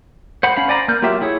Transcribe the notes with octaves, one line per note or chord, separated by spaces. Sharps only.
C5 F#5 B5
C#4 F5 B5
C5 D5 G#5 A#5 B5
A#3 F6 G6
F#3 A#3 F4 G4 E5
E4 G#4 C#5